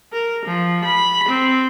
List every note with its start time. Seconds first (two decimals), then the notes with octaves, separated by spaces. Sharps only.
0.13 A#4
0.46 F3
0.85 B5
1.29 C4